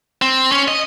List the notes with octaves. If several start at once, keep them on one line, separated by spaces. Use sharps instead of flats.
C4
C#4
D#5